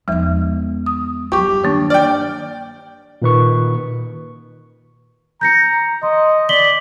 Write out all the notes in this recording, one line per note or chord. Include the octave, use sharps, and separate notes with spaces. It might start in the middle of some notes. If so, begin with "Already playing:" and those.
E2 F3 G#3 B3
D#6
G2 F#3 G4 C#6 D6
D#3 A#3 D4
D5 G5 F6
A#2 D#3 B4 C#6
A#5 G6 A#6 C#7
D#5 C6
D5 B6 F#7 G7